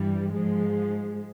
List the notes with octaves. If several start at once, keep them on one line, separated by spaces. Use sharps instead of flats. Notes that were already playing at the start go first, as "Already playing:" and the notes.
Already playing: G2 E3 G3
G#2 F3 G#3